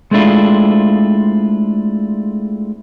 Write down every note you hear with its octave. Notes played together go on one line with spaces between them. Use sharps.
G#3 A3 C4 D4 E4 F4